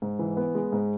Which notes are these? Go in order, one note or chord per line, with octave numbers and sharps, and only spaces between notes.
G#2
E3
B3
G#3
G#2